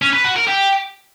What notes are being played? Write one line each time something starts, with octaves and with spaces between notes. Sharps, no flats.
C#4
B4
F#4
A#4
G4